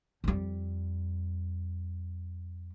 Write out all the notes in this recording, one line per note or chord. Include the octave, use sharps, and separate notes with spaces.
F2 G3